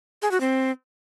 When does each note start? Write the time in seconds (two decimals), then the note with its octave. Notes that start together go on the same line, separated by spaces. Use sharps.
0.22 G#4
0.31 F#4
0.41 C4